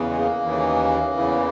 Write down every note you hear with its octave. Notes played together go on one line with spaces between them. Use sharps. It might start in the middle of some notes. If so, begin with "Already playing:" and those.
Already playing: E2 C#3 E3
G#3
A#3
D#2 C#3 E3
E2 C#3 E3